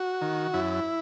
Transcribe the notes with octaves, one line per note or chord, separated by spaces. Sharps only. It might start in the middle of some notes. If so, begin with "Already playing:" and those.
Already playing: F#4
D#3
F#2 E4